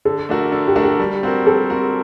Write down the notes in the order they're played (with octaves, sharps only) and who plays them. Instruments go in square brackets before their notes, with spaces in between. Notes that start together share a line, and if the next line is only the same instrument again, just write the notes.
[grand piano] D3 [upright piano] A4
[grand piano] A3 D4 F#4 A#4
D3
[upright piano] G4
[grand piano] A3 D4 F#4 A#4
[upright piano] G4
[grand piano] G3
C4 F#4 A#4
[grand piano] G3 [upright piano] A4
[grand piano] C4 F#4 A#4